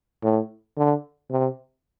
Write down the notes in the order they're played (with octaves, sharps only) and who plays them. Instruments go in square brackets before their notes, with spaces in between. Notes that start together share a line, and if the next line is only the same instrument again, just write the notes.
[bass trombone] A2
D3
C3